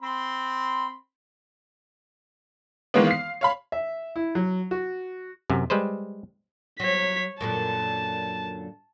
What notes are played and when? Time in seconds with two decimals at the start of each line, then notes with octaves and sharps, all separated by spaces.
0.02 C4 B5 C6
2.94 D#3 E3 G#3 A#3 B3
3.07 F5 C7
3.41 C#5 F5 B5
3.72 E5
4.16 E4
4.35 F#3
4.71 F#4
5.50 F#2 C3
5.70 G3 G#3 B4 C5
6.80 F#3 C#5 B6
7.41 F#2 A#2 D3 A5